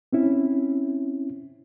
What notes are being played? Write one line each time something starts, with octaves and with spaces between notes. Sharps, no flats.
C4 C#4 E4